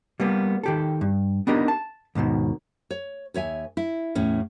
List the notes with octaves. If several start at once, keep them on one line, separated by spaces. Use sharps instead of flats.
G3 A#3 B3
D#3 G4 A4
G2
B3 D4 D#4 G4 A#4
A5
D#2 G#2 B2 D#3
C#5
D#2 C#5 E5 G#5
E4
E2 A2 C#4